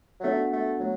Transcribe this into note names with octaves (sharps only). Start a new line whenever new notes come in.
F#3
A3 B3 D4 F#4 D5 F#5
A3
F#3 A3 F#4